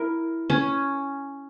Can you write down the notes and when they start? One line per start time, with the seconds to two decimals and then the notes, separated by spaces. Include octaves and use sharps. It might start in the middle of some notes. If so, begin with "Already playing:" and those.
Already playing: E4 A#4
0.50 C#4